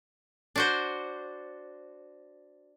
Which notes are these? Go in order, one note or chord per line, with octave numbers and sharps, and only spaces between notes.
D4 F#4 C5